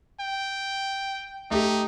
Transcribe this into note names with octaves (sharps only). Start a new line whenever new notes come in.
G5
A3 D#4 G4